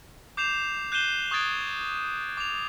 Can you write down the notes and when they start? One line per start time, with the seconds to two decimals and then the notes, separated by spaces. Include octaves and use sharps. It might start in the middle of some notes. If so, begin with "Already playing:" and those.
0.37 D6 G6 C7 E7 F7
0.92 F#6 G6 C7 D#7 E7 G7
1.31 C#6 D#6 F#6 G#6 A6 D7
2.37 D6 F7